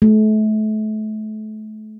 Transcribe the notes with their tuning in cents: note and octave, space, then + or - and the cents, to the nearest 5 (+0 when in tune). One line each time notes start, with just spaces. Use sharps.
A3 -35